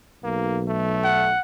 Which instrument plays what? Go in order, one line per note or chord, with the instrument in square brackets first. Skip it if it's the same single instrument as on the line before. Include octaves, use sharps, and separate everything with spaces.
[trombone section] B1 [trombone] A#3
[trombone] A3
[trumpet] F#5